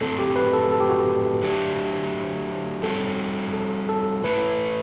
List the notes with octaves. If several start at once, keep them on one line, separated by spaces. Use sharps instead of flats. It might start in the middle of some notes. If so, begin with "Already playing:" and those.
A2 F#3 C4 A4
G4
B4
A4
A4
G4
F#4
G4
D3 F#3 A3 D4 G4
G3 C4 F#4 A4
A4
A4
E3 A3 E4 A4 B4